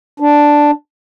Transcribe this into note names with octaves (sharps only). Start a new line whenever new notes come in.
D4